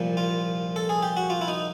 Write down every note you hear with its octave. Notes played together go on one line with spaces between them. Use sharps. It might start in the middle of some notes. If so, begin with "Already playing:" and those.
Already playing: C2 A#2 F3
F4
A4
G#4
G4
F#4
F4
E4
D#4